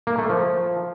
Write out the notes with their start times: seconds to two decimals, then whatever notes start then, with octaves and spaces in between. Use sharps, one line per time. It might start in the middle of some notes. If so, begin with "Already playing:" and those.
0.07 A#3
0.18 A3
0.30 F3